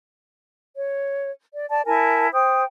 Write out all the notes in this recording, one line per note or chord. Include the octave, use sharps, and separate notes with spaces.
C#5
D5
D5 A5
E4 A#4 G#5 A5
C5 G5 D#6